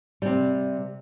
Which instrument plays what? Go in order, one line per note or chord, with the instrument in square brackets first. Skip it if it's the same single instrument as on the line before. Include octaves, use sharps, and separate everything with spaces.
[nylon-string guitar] C3 G3